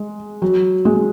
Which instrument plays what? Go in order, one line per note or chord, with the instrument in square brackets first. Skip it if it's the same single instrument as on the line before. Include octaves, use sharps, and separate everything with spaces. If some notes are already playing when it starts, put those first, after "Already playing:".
Already playing: [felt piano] G#3
F#3
G#3